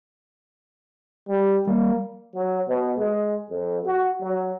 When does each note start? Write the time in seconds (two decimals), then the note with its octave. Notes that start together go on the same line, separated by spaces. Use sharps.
1.29 G3
1.67 G3 A#3
2.34 F#3
2.68 B2
2.97 G#3
3.50 F2
3.85 F#4
4.21 F#3